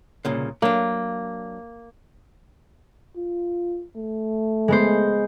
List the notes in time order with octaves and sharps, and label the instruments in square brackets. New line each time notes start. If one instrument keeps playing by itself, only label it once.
[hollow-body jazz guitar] C2 A#2 C#3
[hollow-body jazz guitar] F#3 D4 [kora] A#3
[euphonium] F4
A3
[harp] G#3 B3 C5